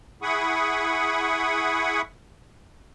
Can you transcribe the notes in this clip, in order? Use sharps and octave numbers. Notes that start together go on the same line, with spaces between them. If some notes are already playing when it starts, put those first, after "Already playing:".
E4 G#4 F#5 B5 C#6 D#6